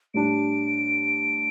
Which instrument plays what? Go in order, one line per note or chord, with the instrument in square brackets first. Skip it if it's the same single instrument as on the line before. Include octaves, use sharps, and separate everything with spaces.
[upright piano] A2 G3 D4 G4 [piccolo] D7